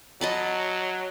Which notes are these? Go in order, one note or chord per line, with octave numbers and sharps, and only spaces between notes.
F#3 D#5 A5 B5